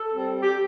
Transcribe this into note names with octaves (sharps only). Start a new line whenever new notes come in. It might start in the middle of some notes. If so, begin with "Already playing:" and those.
Already playing: A4
G3 C4
G4